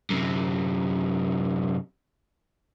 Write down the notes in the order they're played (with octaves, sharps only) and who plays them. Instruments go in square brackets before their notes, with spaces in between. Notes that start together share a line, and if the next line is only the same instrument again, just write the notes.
[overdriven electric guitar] F#2 C3